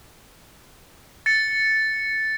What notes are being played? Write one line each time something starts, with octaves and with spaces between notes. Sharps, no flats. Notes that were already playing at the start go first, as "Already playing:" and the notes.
A6 C#7